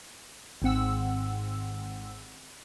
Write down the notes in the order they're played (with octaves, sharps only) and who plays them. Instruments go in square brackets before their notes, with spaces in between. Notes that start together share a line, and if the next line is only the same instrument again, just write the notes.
[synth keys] G#1 G#2 C4 F#5 E6